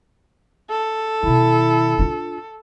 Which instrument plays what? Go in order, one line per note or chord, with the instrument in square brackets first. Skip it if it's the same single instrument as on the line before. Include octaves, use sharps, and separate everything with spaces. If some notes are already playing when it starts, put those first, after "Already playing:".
[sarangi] A4
[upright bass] B2 D#3 [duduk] E4
[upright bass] D4 F4